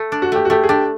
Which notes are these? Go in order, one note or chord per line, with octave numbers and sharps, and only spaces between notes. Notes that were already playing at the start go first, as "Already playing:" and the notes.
Already playing: A3
D4
F#4
A3 G4
F#4
A3 G4
G#4
D4 G4